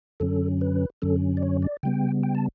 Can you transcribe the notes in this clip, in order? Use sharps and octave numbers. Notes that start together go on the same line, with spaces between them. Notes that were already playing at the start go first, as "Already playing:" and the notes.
F#2 D3 F#3 C#4 A4
B4
F#2 D3 F#3 C#4 A4
D5
C#5
D5
C#3 G3 B3 G5
G5
A5